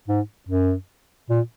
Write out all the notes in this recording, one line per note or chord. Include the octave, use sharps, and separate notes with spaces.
G#2
F#2
A#2